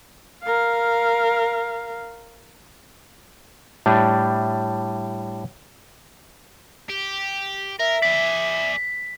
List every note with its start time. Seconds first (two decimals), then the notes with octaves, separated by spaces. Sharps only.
0.44 A#4 F5
3.86 A2 G3 D4
6.89 G4
7.79 A#4 E5
8.02 G#4 D5 B6